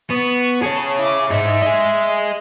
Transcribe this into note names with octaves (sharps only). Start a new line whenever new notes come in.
B3 C#6
G#4 C#5 A5
E4 D6
G#2 D#4 E5
G#4 D#5